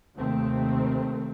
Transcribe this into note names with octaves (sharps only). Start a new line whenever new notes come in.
D#2 C3 D#3 A3 C4